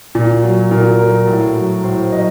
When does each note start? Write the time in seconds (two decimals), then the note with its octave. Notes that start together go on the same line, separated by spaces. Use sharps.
0.15 A#2
0.43 F#3
0.71 A#2 A#4
0.99 F#3 A#4
1.28 A2
1.55 F#3
1.83 A2 C5
2.12 F#3 D#5